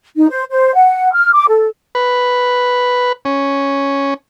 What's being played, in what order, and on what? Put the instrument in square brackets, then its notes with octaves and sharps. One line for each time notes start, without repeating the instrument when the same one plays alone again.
[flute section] D#4
C5
C5
F#5
F6
D6
A4
[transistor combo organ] B4
C#4